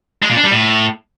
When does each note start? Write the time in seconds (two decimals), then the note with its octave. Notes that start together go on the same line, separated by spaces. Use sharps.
0.22 G#3
0.30 A#2
0.37 D4
0.44 G3
0.51 A2